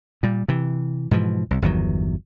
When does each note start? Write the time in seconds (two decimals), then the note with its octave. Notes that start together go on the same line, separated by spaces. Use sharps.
0.23 A#2 G3
0.48 C3 E3
1.11 G#2 B2 E3 F3
1.51 C2
1.62 G1 E2 D#3 F#3